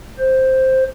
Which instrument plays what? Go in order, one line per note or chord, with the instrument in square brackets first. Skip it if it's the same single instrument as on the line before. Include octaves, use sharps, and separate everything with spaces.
[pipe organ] C5